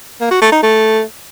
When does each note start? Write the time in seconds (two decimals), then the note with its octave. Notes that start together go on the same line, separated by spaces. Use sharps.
0.21 A#3
0.31 F#4
0.42 A3
0.52 D#4
0.63 A3